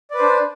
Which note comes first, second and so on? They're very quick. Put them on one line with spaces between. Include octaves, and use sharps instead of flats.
D5 B4 C5 D4